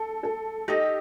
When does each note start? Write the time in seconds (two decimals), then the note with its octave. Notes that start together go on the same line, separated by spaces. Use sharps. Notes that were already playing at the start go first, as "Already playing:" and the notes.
Already playing: A4
0.23 A4
0.68 D#4 G4 A4 D#5